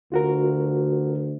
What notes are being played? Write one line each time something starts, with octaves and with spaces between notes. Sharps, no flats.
D2 F4 F#4 A#4